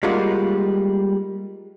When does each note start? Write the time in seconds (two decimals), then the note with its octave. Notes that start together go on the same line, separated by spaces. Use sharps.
0.03 G3 G#3 A#3 D#4 F4 F#4